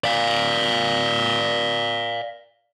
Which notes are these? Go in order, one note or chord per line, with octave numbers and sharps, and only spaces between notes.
D5 F5